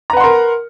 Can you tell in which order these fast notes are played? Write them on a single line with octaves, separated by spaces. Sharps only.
A#5 B4 F#5 C6 A#4